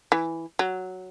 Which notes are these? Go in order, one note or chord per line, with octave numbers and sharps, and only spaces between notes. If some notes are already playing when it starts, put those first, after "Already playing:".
E3
F#3